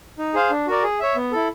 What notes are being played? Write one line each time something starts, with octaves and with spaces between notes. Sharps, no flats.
D#4
G#4 C5 F5
D4
F#4 A#4 D5
G#4
C#5 E5
B3
E4 A4